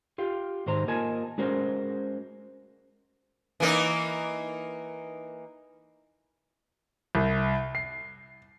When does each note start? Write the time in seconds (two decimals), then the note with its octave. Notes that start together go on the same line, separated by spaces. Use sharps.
0.18 F4 G4 F5
0.66 G#2 D#3 C5 A#5
0.88 A#3 F4 A#4 D#5 G#5 A5
1.38 G#3 C#4 F#4 A#4 C5
3.60 E3 A#3 D#4
7.15 C2
7.75 C7